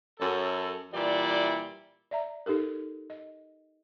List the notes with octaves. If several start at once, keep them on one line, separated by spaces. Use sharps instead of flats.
F#2 A4
A#2 E3 G3 E4 D5
D5 E5 A#5
D#4 G4 A4 A#4
D#5